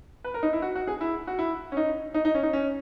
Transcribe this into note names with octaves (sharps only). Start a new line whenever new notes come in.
B4
A#4
D#4
E4
F#4
F#4
G#4
E4
F#4
E4
C#4
D#4
D#4
D#4
C#4
D#4
C#4